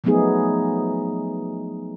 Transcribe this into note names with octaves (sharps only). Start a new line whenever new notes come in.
F3 F#3 A3 B3 D#4 G#4